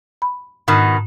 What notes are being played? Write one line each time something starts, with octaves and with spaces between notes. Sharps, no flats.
B5
G#2 B2 D#3